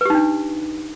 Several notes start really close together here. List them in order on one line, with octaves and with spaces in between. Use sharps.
B4 G4 D#4 D4